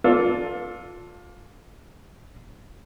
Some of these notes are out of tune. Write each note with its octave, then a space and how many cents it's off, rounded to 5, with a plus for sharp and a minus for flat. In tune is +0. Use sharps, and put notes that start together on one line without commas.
D4 -15 F4 +25 A4 +0